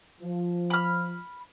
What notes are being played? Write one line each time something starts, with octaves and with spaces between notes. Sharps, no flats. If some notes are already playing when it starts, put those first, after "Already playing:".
F3
B5 F6